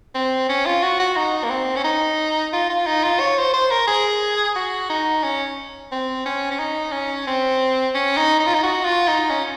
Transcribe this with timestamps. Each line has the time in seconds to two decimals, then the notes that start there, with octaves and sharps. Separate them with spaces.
0.15 C4
0.49 C#4
0.66 F4
0.83 F#4
1.00 F#4
1.17 D#4
1.44 A#3
1.50 C4
1.76 C#4
1.84 D#4
2.53 F4
2.70 F4
2.87 D#4
3.04 F4
3.20 C#5
3.38 C5
3.54 C5
3.71 A#4
3.88 G#4
4.56 F#4
4.90 D#4
5.24 C#4
5.92 C4
6.26 C#4
6.52 C#4
6.59 D#4
6.93 C#4
7.27 C4
7.95 C#4
8.17 D#4
8.40 D#4
8.47 F4
8.55 D#4
8.63 F#4
8.85 F4
9.08 D#4
9.31 C#4